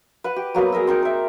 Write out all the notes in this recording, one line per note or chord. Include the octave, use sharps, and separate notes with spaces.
B4 F#5
G4
F#3 A#3 B3 B4
G#4 A#4 D#5 E6
C4 D#4 A#4
A#4 E5